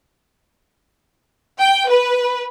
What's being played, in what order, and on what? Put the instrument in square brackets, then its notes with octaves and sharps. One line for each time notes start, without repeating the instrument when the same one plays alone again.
[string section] G5
B4